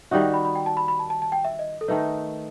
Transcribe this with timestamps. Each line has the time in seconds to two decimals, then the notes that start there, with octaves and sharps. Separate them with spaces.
0.11 D#3 G3 D#4 F#4 E5
0.21 G5
0.34 B5
0.45 B5
0.55 G5
0.66 A5
0.77 B5
0.88 B5
0.99 A5
1.10 A5
1.22 A5
1.32 G5
1.44 E5
1.59 D#5
1.81 A4
1.88 D#3 A3 D#4 B4